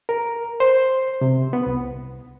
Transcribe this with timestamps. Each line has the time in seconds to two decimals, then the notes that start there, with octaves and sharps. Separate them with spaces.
0.09 A#4
0.60 C5
1.21 C3
1.53 B3
1.66 C2